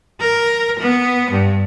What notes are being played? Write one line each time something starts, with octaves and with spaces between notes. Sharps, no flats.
A#4
B3
G2